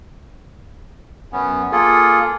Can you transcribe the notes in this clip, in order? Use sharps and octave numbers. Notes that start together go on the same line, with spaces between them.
F#2 B3 C#4
A#3 F4 G#4 A4